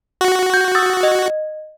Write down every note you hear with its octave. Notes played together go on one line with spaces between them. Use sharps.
F#4
G6
D#6 E6 A6
D#5